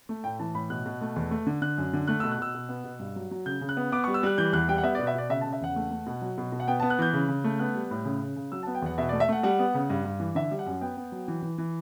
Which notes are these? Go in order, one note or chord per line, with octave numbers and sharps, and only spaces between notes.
A3
A2 G5
E3 A5
A2 B5
B2 F#6
B2
A3
E2
A3
D3
D3 F#6
F#2
D3
A3 F#6
E6
B2
F#6
B2 E6
B2
B3
B2
G2
F#3
F#3
C#3 G6
C#3
F#6
B3
B3 D6
C#6
G3
E6
G3 F#6
E3 G6
E2 F#6
G3 G5
F#5
B3 E5
D5
B2
E5
B2 D5
C#3 E5
A5
C#3
E5
E2 F#5
A3
A3
B2
F#3
B2
B2
F#5
B3 G5
B3 A5
F#6
E3 G6
C#3
C#3
A3
B3 F#6
G3
A2
C#3
C#3
C#3
F#3 E6
A5
B3
G5
E2 F#5
B2 E5
D5
A3
E5
A3 F#5
G3 F#5
B3
C#3
G2
G2
E3
D3 E5
G3
F#5
F#2
B3 G5
B3
F#3
E3
E3
E3